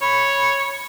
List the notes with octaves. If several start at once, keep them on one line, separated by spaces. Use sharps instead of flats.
C#5 B5